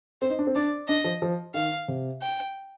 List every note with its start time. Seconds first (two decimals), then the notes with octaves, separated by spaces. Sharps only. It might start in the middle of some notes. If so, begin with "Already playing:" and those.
0.22 C4 C5
0.30 D#4
0.39 D4
0.47 C4
0.56 D4 D5
0.88 D4 D#5
1.04 F3
1.22 F3
1.54 D#3 F5
1.88 C3
2.22 G5